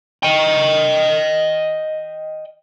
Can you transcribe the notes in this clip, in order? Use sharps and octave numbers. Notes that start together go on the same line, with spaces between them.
D#5 G5